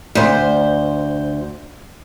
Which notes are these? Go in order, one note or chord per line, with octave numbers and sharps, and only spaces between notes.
D2 C5